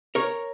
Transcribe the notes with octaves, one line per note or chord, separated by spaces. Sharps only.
A#4 C#5